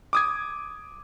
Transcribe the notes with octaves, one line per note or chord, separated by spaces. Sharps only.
D6 D#6 G#6